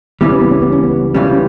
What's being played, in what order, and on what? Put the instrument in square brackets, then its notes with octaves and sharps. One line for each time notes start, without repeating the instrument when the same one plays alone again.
[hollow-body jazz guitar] C#2 C#3 E3 G3 [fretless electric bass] B3
[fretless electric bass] C#4
B3
C#4
B3
C#4
B3
[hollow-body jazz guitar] C#2 C#3 E3 G3 [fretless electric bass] C#4
[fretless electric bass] C#4